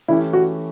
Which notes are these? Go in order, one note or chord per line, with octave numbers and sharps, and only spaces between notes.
E3 A3 C#4 E4 G4
F#4